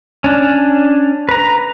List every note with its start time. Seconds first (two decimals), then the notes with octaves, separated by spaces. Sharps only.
0.24 C#4 D4
1.29 B4 A#5